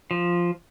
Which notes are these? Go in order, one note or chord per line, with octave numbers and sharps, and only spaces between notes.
F3